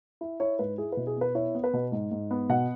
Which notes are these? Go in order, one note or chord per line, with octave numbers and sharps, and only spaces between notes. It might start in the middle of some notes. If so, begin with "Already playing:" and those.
E4
E4 C#5
G#2 B4
E4 G#4
B2 B4
G#4
B3
B4
E4 C#5
B3
B4
B2
G#2
G#2
B3
B2 F#5